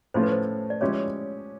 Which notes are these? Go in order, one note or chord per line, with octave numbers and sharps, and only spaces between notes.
A2 F3 A3 C#4 F4 C5
B4
C5
D5
F3 G#3 C#4 E4 G4 C#5